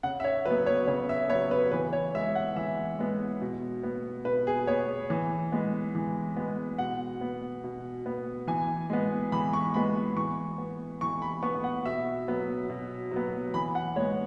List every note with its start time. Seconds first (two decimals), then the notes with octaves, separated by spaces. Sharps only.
0.03 C#3 F#5
0.20 E5
0.24 C#5
0.45 F#3 B4
0.50 B3
0.66 C#5
0.87 C#3 C#5
1.09 E5
1.29 F#3 B3 C#5
1.51 B4
1.72 E3 B4
1.93 C#5
2.15 G#3 B3 E5
2.35 F#5
2.56 E3 E5
2.99 G#3 B3
3.41 B2
3.83 B3
4.25 B2 B4
4.47 G#4
4.67 B3 C#5
5.10 E3
5.52 G#3 B3
5.95 E3
6.36 G#3 B3
6.78 B2 F#5
7.21 B3
7.64 B2
8.06 B3
8.48 E3 G#5
8.90 G#3 B3
9.32 E3 B5
9.53 C#6
9.74 G#3 B3 B5
10.16 E3 C#6
10.58 B3
11.01 E3 C#6
11.22 B5
11.43 B3 C#6
11.64 F#5
11.85 B2 E5
12.28 F#3 B3
12.70 B2
13.11 F#3 B3
13.54 E3 B5
13.75 F#5
13.96 G#3 C#5
14.00 B3